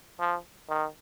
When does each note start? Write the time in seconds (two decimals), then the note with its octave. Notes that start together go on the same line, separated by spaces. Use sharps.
0.19 F3
0.69 D#3